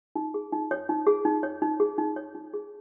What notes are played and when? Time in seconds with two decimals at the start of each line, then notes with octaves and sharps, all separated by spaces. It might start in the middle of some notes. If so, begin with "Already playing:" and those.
0.16 D#4
0.34 G#4
0.52 D#4
0.71 C#5
0.89 D#4
1.07 G#4
1.25 D#4
1.43 C#5
1.62 D#4
1.80 G#4
1.98 D#4
2.16 C#5
2.35 D#4
2.54 G#4